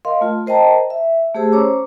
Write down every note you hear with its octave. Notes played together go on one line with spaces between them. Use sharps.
A#4 D#5 F5 C6
A3 F4
A#4 C5 D#5 G5 A5 A#5
E5
A3 G4 G#4 C5 A5 E6
C#4 C5 C#5 A#5 D6